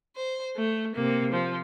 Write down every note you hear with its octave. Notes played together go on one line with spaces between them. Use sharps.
C5
A3
C3 A#3
F3